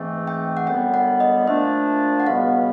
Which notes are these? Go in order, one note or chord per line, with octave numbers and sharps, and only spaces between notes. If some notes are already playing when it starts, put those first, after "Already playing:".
Already playing: G#2 E3 A3 C4
G5
F#5
F#2 D3 G3 B3 G5
F#5
D#5
A#2 F3 A3 D4 E5
F#5
C#2 B2 G3 B3 F5